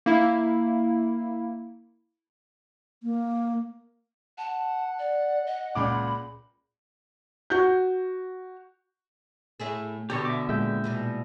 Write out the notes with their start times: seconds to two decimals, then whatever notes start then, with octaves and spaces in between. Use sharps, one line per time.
0.06 A#3 E4
3.03 A#3
4.38 F#5 A5
4.99 D5
5.47 D#5
5.75 C#2 A#2 B5 D6
7.50 F#4 G6
9.60 A2 A3 G#4
10.10 B2 D3 G4 A4 C#5
10.25 E5 D6
10.49 A#2 G#3 E5 G5
10.84 B2 E3 G3